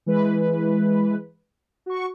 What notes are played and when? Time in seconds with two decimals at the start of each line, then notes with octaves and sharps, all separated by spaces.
0.06 E3 G#3 B4
1.86 F#4 C#6